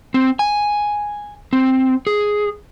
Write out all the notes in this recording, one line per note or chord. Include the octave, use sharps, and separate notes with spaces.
C4
G#5
C4
G#4